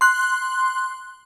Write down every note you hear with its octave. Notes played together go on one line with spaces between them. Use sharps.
C6 F#6